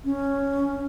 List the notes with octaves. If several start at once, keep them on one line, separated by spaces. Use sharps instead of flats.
C#4